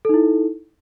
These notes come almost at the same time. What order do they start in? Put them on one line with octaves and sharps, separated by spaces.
A4 D#4 E4